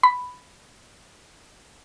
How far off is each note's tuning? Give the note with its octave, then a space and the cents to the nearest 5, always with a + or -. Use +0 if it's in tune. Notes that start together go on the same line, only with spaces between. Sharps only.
B5 +5